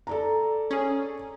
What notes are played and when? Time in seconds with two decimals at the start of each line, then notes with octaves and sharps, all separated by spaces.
0.07 A4 D5 A#5
0.71 C#4 G#4